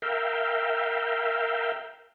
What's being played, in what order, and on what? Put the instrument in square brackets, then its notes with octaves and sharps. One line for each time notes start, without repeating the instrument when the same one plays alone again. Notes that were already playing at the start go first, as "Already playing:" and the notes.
[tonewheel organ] A#4 E5 F5 G5